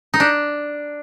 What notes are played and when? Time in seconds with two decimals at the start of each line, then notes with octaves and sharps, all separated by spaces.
0.14 D#4
0.20 D4